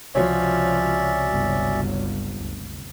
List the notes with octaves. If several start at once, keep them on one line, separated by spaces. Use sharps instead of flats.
C#2 C3 F3 C#4 F#4 C#5 D5 E5
G1
D2